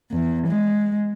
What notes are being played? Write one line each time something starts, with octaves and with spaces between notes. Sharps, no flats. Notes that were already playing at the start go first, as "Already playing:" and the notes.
E2
G#3